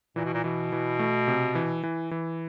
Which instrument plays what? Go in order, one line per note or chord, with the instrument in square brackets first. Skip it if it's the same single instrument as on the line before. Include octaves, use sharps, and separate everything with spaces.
[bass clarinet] A#2 [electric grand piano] E3
[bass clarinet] B2
A#2
[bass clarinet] B2 [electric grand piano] E3
[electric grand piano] E3
A3
C3
E3
E3
E3